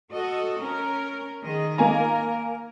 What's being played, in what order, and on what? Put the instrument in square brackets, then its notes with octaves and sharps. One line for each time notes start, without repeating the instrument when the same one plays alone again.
[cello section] F#4 A4 D#5
C#4 A#4
D#3 G#4 D#5
[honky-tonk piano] A#3 G#5 A#5 [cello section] A#4